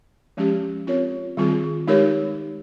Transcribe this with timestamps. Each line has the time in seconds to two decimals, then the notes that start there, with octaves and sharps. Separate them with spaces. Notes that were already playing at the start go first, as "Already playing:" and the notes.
0.37 F3 G#3 C#4 G4
0.87 C4 F4 A#4 C#5
1.37 D#3 G3 C4 F4 G#4
1.87 G#3 D#4 G4 A#4 C#5